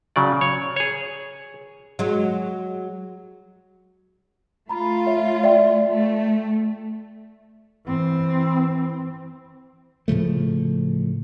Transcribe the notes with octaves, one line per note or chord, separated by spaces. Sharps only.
C#3 F#3 D5
C#5
G#4 C#5
F#3 G#3
A3 F4 A#5 B5
C#5 E5 F5
D5 E5 G5
A3
E3 C4
A2 C#3 F3 A3